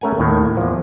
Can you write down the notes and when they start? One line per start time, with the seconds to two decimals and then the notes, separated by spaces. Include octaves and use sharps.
0.01 A3 C#4 A#4 F#5 G#5
0.18 D#2 A2 D#3
0.57 E2 F3